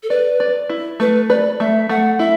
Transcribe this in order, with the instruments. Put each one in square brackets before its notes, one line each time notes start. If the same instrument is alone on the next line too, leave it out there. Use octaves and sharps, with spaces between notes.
[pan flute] A4
[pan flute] B4 [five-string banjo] D5
[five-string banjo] D5
E4
[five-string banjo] A3 [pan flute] B4
[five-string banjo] B4 [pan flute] D5
[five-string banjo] A3 [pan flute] E5
[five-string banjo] A3 [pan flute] F#5
[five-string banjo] E4 [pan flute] E5